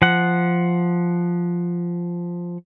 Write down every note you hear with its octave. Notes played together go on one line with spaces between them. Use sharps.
F3 F#5